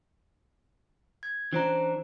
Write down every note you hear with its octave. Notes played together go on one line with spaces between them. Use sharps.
G#6
E3 C#4 D4 C5 A#5